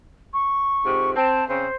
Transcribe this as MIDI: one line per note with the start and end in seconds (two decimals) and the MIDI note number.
0.33 1.11 85
0.84 1.15 41
0.84 1.15 44
0.84 1.15 48
1.16 1.44 60
1.16 1.47 81
1.48 1.66 49
1.48 1.66 60
1.48 1.76 72